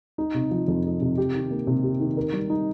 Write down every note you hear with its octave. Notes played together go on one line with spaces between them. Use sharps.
D#4
C3
F3
F2
D#4
C3
G4
D#3
A#3
C3
G4
D#3
A#4
G3
D#4